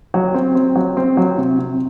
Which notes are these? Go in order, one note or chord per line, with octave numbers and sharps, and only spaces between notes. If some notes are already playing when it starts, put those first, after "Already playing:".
F#3
C4
C4
F#3
C4
F#3
C3
C3